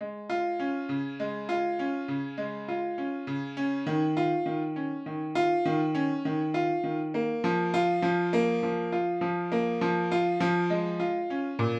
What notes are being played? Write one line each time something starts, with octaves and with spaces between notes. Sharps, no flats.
G#3
F4
C#4
C#3
G#3
F4
C#4
C#3
G#3
F4
C#4
C#3
C#4
D#3
F4
D#3
C#4
D#3
F4
D#3
C#4
D#3
F4
D#3
A#3
F3
F4
F3
A#3
F3
F4
F3
A#3
F3
F4
F3
G#3
F4
C#4
A#2